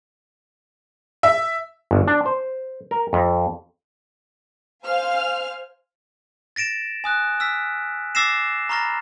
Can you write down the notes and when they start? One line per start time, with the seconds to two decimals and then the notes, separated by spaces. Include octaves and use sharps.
1.23 E5
1.91 G1
2.08 D4
2.26 C5
2.91 A#4
3.13 F2
4.85 C5 F5 G#5 F6
6.56 A6 A#6 D7 E7
7.04 G#5 D#6 F#6
7.40 E6 F6 B6
8.15 D6 E6 A6 A#6 C7 E7
8.69 A#5 B5 C#6 F6 A6 A#6